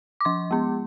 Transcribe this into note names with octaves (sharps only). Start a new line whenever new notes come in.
D6
F3 C6
G#3 B3